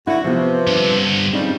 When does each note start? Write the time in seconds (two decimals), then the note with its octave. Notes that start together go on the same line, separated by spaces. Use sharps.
0.07 G2 D3 E4 F#4
0.24 C3 F3 B3
0.67 G2 D3
1.33 C#3 F3 G3 C4 D#4